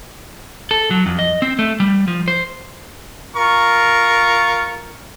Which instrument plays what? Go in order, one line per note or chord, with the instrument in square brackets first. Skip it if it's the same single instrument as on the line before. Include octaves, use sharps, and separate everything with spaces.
[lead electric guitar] A4
F#3
F2
D#5
C4
A3
G3
F3
C5
[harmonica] F4 A#4 C#6